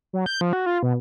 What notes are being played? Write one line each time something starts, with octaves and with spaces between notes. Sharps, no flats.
F#3
G6
F3
F#4
F4
B2